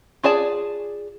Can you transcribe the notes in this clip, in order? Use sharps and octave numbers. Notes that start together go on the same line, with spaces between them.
F4 G#4 D5 A5